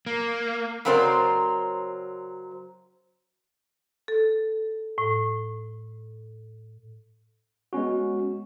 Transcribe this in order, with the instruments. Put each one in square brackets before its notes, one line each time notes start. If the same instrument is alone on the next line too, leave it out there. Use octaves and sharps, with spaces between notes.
[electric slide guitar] A#3
[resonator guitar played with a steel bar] C#3 F#3 C4 A#4 C5 D5
[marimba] A4
A2
[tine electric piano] G#3 B3 C#4 F#4